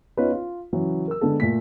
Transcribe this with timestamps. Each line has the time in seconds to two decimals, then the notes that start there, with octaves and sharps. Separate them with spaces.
0.17 B3 C#4 D#4 F4 B4 C#5
0.32 F4
0.73 C#3 E3 F#3
1.08 A#4 E6
1.21 D3 G#3 B3 A4
1.40 A#2 A3 B6